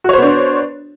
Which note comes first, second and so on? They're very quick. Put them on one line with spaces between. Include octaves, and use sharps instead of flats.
F#4 C#5 C5 B3 D4